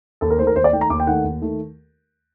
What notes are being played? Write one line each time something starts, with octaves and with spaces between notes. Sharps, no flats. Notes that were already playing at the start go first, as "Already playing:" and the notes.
D#2 A4
A#4
D#3 A3 C5
A#4
D#2 C5
D5
D#3 A3 G5
A#5
D#2 D6
G5
D#3 A3 F#5
D#2
D#3 A3